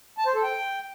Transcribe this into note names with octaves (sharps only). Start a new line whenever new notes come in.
A5
C5
A4
G5